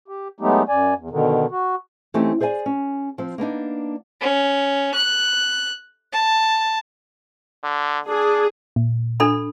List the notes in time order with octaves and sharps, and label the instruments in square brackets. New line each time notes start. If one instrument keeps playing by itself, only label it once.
[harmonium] G4
F#3 G#3 A3 B3 D#4 G4
F#2 D5 G#5
E2
B2 D3 D#3
F#4
[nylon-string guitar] E3 A3 C4 C#4 D#4 G4
G#4 C5 D5 E5 G#5
C#4
F3 C4
A#3 B3 D4 D#4
[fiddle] C#4
F#6
A5
[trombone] D3
[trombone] D4 [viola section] G#4
[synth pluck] A#2
[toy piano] D4 A4 B5